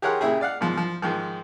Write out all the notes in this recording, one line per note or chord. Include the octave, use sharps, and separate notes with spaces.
G4 G#4 A#4 C#5 F#5 C6
A#2 C#3 E4 G4 G#4
D5 F5 F#5
G#2 B2 F3
F3
G#2 D#3 F3